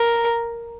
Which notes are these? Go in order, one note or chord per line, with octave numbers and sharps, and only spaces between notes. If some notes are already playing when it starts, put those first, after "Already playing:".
Already playing: A#4